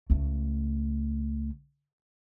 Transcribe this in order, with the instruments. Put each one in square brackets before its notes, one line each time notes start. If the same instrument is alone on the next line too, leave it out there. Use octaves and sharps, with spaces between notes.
[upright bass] C#2 A3